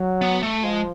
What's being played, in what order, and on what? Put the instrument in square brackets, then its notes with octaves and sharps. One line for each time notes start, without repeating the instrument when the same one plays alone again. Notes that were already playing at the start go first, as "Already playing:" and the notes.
Already playing: [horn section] F#3
[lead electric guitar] B3
A3
[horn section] F3 [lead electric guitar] G#3